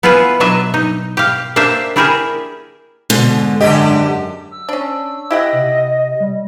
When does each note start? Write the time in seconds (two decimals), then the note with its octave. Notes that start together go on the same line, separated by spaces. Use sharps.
0.03 B3 E4 F4 G#4 B4
0.40 B2 F#3 D4 D#5 E5
0.74 D#4
1.17 G4 F5
1.56 A#3 D4 G4 C5 E5
1.96 D4 E4 G4 G#4 A#4 E5
3.10 G#2 B2 D3
3.61 F#2 D3 G4 D#5
4.51 E6
4.69 C#4 D4
5.31 E4 G4 D#5 F#5
5.53 C3
6.20 G3